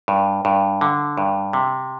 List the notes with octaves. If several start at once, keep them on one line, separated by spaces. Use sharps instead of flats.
G2
G2
D3
G2
C3